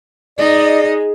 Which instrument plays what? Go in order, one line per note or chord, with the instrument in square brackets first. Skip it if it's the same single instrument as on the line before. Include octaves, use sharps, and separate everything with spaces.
[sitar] G#3 [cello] D#4 D#5 [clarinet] D5